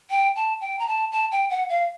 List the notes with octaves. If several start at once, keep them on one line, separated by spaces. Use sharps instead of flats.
G5
A5
G5
A#5
A5
A5
G5
F#5
F5